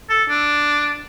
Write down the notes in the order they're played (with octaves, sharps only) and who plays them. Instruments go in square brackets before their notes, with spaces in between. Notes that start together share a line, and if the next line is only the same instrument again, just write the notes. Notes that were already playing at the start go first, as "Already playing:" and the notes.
[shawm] A4
D4